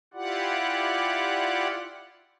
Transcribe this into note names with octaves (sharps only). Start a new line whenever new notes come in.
E4 F4 G4 D5 F#5